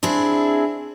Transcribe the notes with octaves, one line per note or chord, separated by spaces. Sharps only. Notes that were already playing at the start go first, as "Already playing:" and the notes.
C4 D4 E4 G#4